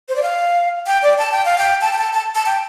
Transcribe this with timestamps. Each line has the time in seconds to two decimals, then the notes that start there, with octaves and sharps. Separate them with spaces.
0.09 C5
0.16 D5
0.22 F5
0.87 G5
1.03 D5
1.18 A5
1.32 G5
1.45 F5
1.58 G5
1.81 A5
1.93 G5
1.98 A5
2.13 A5
2.35 A5
2.46 G5